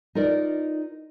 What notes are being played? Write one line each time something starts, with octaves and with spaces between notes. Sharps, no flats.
D#4 F4 A#4 D5